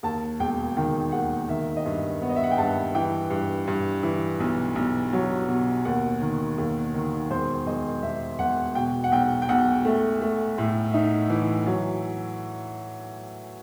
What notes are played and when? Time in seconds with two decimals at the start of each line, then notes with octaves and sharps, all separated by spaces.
0.03 D#2 A5
0.39 E1 G5
0.77 D#3 G5
1.12 D#2 F#5
1.48 D#3 E5
1.77 D#5
1.85 G2 E5
2.22 B3
2.29 D#5
2.36 E5
2.44 F#5
2.51 G5
2.58 G2 A5
2.95 E3 G5
3.30 G2
3.67 G2
4.03 E3
4.40 B1
4.75 B1
5.13 F#3
5.48 B2
5.85 D#2 F#5
6.21 D#3
6.58 D#2
6.94 D#3
7.30 E1 C5
7.66 E1 D#5
8.03 E1 E5
8.39 E1 F#5
8.75 B2 G5
9.04 F#5
9.12 B1 G5
9.42 G5
9.49 B1 F#5
9.85 A3
10.21 A3
10.58 A2
10.93 D#4 E5
11.30 E3
11.66 F#3